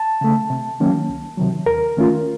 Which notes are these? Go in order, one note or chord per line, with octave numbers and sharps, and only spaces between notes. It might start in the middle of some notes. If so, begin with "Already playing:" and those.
Already playing: A5
C#3 A3
C3
D#3 F#3 A#3 C#4
C2
C3 D#3 F#3
D#2 A#4
D#3 A3 C#4 F4